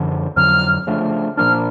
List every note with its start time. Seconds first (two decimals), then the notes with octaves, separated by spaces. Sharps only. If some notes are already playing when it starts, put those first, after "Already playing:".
Already playing: F#2 D3 F3
0.36 F2 D3 F#3 F6
0.87 C#3 F3 A3 D4
1.37 A#2 F3 A#3 D4 F6